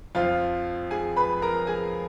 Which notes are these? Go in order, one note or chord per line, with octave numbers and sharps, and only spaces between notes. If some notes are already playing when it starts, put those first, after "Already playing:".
F2 F3 F4 F5
G#4 G#5
B4 B5
A#4 A#5
G#4 G#5